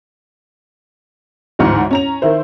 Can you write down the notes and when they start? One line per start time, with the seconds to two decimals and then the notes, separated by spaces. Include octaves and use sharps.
1.59 A1 D2 G#2 F#5 F6
1.91 C#4 A#5 F7
2.22 D#3 E4 C5